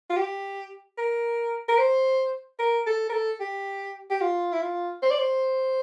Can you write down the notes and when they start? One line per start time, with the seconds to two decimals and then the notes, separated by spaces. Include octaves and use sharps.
0.10 F4
0.17 G4
0.97 A#4
1.68 A#4
1.78 C5
2.59 A#4
2.86 A4
3.09 A#4
3.13 A4
3.40 G4
4.11 G4
4.21 F4
4.52 E4
4.62 F4
5.02 C5
5.10 D5
5.19 C5